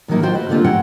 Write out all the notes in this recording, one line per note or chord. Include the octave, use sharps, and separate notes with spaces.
A2 D#3 F#3 A#3 D#4 E4
F4 F#4 C5 F5 G5
B4 D#5
D3 A3 A#3 C4 F4 G4
C#3 C4 C#4 F#5 G5